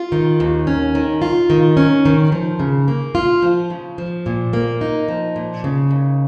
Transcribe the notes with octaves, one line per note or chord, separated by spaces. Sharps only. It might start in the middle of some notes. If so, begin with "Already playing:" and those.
Already playing: F4
D#3
D#2
C#4
D#3
F4
D#3
C#4
D#3
F3
C#3
A#3
F4
F3
C#3
F3
A#2
A#3
D#4
F3
A#2
C#3
D#2